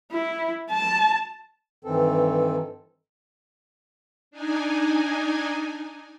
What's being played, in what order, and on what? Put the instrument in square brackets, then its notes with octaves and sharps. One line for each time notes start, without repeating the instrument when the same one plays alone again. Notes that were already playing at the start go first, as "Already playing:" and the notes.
[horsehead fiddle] E4
A5
[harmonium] G2 D#3 E3 C4 A4
[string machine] D4 D#4 G#5